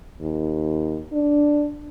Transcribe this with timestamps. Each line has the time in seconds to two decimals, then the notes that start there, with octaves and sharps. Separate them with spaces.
0.21 D#2
1.12 D4